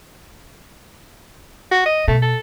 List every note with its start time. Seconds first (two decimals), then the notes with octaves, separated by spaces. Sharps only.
1.71 F#4
1.86 D#5
2.08 B2 A3
2.22 A4